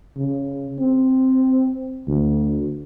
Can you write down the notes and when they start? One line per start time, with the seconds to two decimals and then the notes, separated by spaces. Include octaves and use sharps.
0.17 C#3
0.79 C4
2.07 D2